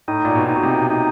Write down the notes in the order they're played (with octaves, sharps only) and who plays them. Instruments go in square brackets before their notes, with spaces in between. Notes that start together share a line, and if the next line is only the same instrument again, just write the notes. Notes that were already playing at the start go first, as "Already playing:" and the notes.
[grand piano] A2 [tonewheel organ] D#4
[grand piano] A#2
B2
[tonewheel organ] D#4
[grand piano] B2
C3
[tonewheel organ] D#4